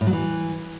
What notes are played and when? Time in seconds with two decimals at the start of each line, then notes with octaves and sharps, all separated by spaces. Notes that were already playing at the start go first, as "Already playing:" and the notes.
0.01 A2
0.07 F#3
0.13 E3